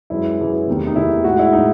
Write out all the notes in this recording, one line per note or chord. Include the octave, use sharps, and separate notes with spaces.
F#2 E3 G#3 E4
F#2 E3 G#3
E2 C3 D#3 A3
D#4
E2 C3 D#3 A3 E4
A2 G#3 F#4
E4
A2 G#3 D#4